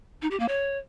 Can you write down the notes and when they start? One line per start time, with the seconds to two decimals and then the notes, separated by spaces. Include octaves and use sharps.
0.22 D#4
0.31 G4
0.40 A#3
0.49 C#5